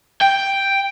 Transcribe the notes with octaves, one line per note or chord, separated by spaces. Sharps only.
G5